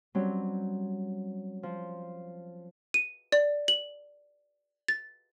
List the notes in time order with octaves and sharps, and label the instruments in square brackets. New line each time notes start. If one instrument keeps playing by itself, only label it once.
[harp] F#3 G3 C4 C#4
F3
[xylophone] D#7
D5
F#7
A6